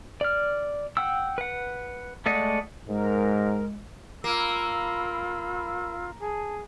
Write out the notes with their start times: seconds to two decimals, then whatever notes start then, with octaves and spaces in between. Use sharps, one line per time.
0.21 D5 F6
0.97 F#5 G5 E6
1.38 B4 F#5
2.26 G#3 A3 D5 D#5 F#5
2.88 G#2 G#3 A#4
4.24 A#3 F4 B5 E6
6.20 G#4 A5